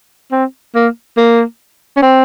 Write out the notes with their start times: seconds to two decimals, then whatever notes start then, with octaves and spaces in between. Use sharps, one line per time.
0.32 C4
0.75 A#3
1.17 A#3
1.97 C#4
2.02 C4